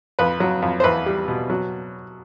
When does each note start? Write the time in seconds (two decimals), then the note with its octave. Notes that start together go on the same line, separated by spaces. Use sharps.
0.19 F2 B4
0.40 F#3
0.62 F2
0.80 C5
0.84 E2 B4
1.06 G3
1.28 B2
1.50 F#3